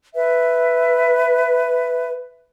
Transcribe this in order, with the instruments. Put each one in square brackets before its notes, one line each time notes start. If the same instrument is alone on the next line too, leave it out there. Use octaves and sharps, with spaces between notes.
[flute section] B4 E5